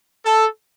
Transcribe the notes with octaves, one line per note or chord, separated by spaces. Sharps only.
A4